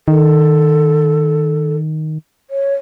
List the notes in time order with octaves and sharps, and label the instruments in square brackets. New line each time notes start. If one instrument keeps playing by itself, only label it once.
[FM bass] D#3 [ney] A4
[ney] C#5